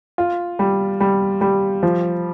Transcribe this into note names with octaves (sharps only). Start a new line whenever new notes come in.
F4
G3
G3
G3
F3